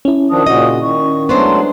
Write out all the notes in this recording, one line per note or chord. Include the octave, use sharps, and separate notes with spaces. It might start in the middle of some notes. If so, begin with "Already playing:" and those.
C#4 E4
D#3 F3 D4 D#6
A#2 C#3 F#4 D#5
D#3 C#6
F#3 G#3 A3 B3 D4 C5 C6